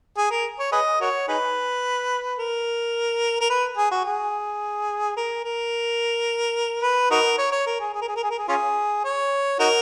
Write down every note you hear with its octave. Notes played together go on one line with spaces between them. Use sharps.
G#4
A#4
C#5
G#4 B4 D#5
F#4 A#4 C#5
D#4 G#4 B4
A#4
A#4
B4
G#4
F#4
G#4
A#4
A#4
B4
D#4 F#4 A#4
C#5
C#5
A#4
G#4
G#4
A#4
G#4
A#4
G#4
A#4
G#4
C#4 F4 G#4
C#5
D#4 F#4 A#4